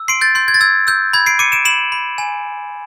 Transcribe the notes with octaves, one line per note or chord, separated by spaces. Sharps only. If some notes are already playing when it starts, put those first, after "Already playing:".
Already playing: E6
C6 C7 D7
G6 A6
C6 G6
G#6
A6
E6 G#6
E6 G6
B5 G#6
C7 D7
D6 C#7 D#7
D7 E7
B5 E7 F#7
B5
G#5